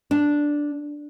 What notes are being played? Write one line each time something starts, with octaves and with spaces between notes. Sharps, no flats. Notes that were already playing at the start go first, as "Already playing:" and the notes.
D4